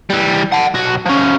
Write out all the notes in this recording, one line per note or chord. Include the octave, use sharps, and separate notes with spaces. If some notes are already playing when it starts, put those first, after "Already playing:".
E3 G3
F#5 A5
B1 F#4
F3 C#4